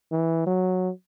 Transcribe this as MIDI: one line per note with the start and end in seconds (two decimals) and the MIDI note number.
0.11 0.44 52
0.46 0.90 54